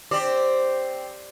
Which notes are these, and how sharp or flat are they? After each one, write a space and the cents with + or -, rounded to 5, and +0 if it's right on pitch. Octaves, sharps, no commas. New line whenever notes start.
C4 +0 G4 +0 D5 +0